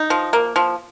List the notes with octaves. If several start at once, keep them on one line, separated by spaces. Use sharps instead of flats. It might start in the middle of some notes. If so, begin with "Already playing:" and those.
Already playing: D#4
F3
A#3
F3